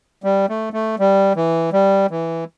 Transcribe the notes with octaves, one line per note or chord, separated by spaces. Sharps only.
G3
A3
A3
G3
E3
G3
E3